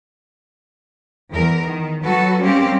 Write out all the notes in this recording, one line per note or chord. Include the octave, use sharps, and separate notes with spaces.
E2 E3 A#4
D#3
F#3 F#4 A4 B4
G3 A#3 C4 C#4 G4